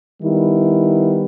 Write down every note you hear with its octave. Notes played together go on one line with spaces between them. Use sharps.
D#3 G3 B3 E4